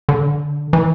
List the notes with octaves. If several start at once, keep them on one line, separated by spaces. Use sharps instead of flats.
D3
E3